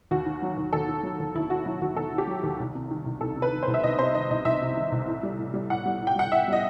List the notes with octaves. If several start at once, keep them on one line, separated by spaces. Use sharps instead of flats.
D#2 F#4
D#3
F#3
D#2
D#2 A4
D#3
F#3
D#2
D#2 E4
D#3 F#4
F#3 E4
D#2 F#4
D#2 A4
D#3
G4
F#3
D#2
C2
C3
D#3
C2
C2 A4
C3
B4
D#3
C2 C5
E5
C2 D#5
C3 C5
D#3 D#5
C2 D#5
C2 E5
C3
D#3
C2
A2
G3
A2
G3
A2 F#5
G3
A2
G5
G3 F#5
A2 E5
G3 D#5